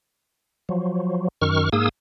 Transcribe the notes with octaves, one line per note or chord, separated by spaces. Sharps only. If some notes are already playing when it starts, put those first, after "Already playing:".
F3 F#3
F#2 D#3 C#6 F6
G#2 A#3 G#4 D#6 E6